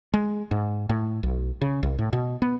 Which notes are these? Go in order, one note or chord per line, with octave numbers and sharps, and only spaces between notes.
G#3
G#2
A2
B1
C#3
C2
A2
B2
B3